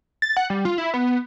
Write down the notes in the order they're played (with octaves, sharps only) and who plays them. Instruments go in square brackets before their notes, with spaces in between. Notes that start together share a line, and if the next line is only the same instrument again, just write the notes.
[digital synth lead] A6
F#5
G3
F4
E4
B3